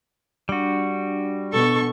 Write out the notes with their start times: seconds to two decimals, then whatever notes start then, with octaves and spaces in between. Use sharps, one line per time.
0.49 G3 D4 F#4
1.53 B2 A4 C#6